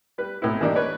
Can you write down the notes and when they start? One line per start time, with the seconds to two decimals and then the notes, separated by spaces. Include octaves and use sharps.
0.18 G3 B4
0.42 G#1 A2 B3 E4
0.61 E3 G3 A#3 D4 D#4 G4
0.75 B4 C#5 D5